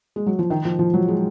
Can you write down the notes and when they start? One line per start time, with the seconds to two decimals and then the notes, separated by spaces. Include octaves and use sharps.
0.16 G#3
0.26 F#3
0.39 F3
0.50 D#3
0.65 F3
0.79 F3
0.94 F#3
1.08 G#3